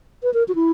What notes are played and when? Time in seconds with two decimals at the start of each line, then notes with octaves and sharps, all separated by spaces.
0.23 B4
0.34 A#4
0.48 F#4
0.55 E4